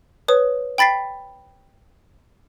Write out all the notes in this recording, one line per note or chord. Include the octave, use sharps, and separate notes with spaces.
B4 C#5 D#6
G5 B5 A6 B6 C7